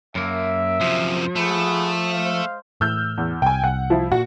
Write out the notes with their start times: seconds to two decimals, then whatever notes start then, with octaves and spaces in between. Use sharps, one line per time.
0.15 F#2 A#3 E5
0.81 F#2 C3 F3
1.36 A3 F#4 G#4 B4
2.13 G#3 C5 F5
2.81 A2 E3 E6 F6 G6
3.18 E2
3.42 C2 G5 G#5
3.64 C2 F#5
3.90 F3 E4
4.12 A#2 F#4